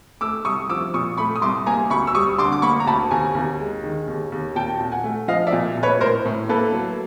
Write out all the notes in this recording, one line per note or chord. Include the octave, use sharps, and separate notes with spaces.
A3 D6 E6
C2 C#6 D#6
F3 D6 E6
A#2 C#6 D#6
A3 B5 C#6
D#6
C2 C6 D6
A#3 G#5 A#5
D2 B5 C#6
E6
G3 C#6 D#6
D3 C6 D6
D6
A#3 B5 C#6
A#5
D2 A5 B5
D#2 G#5 A#5
D#2
G#3
D#3
D#2
D#2
A#2 G5 A5
A#2
F#5 G#5
A3
F3 D#5 F5
D5 E5
A#2
A#2
B4 C#5
A2 A#4 C5
A2
A#3 A4 B4
F#3